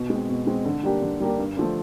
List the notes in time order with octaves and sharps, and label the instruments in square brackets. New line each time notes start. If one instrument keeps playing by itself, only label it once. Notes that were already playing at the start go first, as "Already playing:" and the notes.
Already playing: [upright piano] B2
G#3 C4
B2
G#3 C4
D3
G3 A#3 D4 G4
D3
G3 A#3 D4 G4
G2
D3 F3 A3